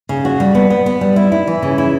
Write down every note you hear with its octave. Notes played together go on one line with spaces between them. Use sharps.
C#3
F#4
G3
B3
B3
B3
G3
E4
E4
E3
C#3
E4